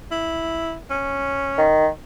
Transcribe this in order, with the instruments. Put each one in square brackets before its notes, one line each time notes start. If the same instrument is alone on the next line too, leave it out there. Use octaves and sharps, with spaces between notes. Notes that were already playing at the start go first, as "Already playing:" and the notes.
[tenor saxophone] E4
C#4
[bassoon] D#3